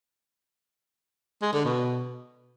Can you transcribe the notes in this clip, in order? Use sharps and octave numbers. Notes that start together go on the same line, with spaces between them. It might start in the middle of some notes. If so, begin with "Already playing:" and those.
G#3
D3
B2